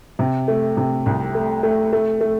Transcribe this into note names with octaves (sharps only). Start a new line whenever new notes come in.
C3
A3
C3
C2
A3
A3
A3
A3